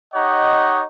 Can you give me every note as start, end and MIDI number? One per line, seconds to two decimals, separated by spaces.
0.15 0.84 63
0.15 0.84 67
0.15 0.84 73
0.15 0.84 75
0.15 0.84 78